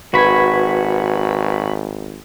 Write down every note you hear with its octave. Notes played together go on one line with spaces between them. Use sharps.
G#1 F#4 B4 B5 G#6